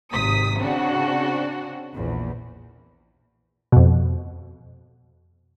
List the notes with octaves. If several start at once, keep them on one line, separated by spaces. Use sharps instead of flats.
G#1 C3 D#6 B6
C#3 C4 D4 F#4
A#1 E2
F2 B2